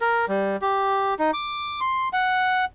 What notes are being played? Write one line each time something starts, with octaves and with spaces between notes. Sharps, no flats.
A#4
G3
G4
D#4
D6
C6
F#5